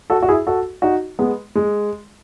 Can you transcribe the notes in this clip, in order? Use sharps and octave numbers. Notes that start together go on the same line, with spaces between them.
F#4 A4
F#4
E4 G#4
F#4 A4
D#4 F#4
G#3 B3
G#3